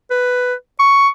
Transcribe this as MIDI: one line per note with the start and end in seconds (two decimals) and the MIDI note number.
0.11 0.54 71
0.79 1.08 85